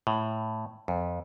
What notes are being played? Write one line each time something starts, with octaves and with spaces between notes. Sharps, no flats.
A2
F2